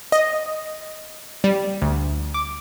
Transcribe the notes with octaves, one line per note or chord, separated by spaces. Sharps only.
D#5
G3
D2
D6